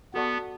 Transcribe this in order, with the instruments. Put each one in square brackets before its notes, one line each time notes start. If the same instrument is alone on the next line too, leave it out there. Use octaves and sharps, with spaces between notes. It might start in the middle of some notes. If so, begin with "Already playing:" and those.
[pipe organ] B3 [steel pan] F#4 A4 D5 F#5 C#6